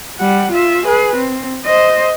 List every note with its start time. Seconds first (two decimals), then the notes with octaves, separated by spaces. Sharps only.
0.20 G3 F#5
0.51 F4 E5
0.86 G#4 B4
1.16 C4
1.65 C5 D#5